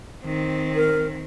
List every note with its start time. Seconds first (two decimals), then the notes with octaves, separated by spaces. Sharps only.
0.24 D#3 C4
0.75 A#4